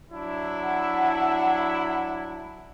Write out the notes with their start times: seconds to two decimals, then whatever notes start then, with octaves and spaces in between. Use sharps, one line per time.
0.12 F#3 D4 E4
0.62 F#5